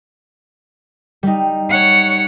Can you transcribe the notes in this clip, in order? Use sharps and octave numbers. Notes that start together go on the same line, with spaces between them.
G3 D#4
C#5 F#5